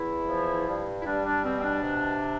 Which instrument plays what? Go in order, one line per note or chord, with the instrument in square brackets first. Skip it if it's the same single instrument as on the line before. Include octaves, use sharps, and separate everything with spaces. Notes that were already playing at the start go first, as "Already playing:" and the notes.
Already playing: [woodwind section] E2 E4
F3
G2
E4
G3 D4
D4
B2 C4
C4
D4
C3